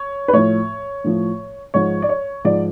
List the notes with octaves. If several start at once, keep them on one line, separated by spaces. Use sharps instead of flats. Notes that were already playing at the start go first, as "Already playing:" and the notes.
Already playing: C#5
B4
A2 F3 C#5
A2 F3
G#2 F3 C#5
D5
C#5
G#2 F3 D5